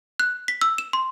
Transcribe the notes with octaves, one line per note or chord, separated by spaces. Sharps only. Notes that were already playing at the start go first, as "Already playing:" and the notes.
F#6
B6
E6
E7
C6